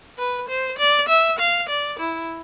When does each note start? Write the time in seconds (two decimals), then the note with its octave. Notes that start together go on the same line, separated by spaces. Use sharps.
0.18 B4
0.49 C5
0.79 D5
1.09 E5
1.39 F5
1.69 D5
1.99 E4